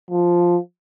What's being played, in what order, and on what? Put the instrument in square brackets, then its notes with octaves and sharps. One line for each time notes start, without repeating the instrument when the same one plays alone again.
[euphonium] F3